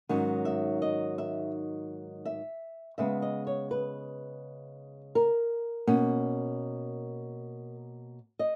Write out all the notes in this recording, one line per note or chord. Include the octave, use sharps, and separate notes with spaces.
G#2 D#3 F#3 C#4
E5
D#5
E5
E5
C#3 G#3 B3 E5
D#5
C#5
B4
A#4
B2 A#3 C#4
D#5